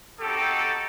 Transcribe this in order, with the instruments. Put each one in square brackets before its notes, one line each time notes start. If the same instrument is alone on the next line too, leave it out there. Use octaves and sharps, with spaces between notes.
[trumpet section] C4 D#4 F#4 G4 A4